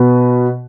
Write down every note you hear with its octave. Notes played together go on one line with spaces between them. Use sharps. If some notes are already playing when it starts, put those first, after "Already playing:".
Already playing: B2 B3 F#4 B4